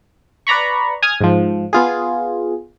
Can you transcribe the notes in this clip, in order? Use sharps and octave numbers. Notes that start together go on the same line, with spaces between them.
B4 D5 A#5 B5 C#6
G#5 D#6 F6 G#6
G#2 F3
B3 F4 G#4